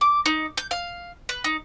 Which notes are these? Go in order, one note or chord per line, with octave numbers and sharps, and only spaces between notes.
D6
D#4
G6
F5
B4
D#4